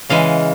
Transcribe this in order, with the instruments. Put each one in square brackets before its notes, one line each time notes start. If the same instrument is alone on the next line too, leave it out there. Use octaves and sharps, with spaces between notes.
[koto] C#3 E3 G#3 F5